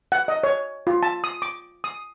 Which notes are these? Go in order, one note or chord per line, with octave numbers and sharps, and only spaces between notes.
F#5
D#5
C#5
F4
A5
D#6
D6
D#6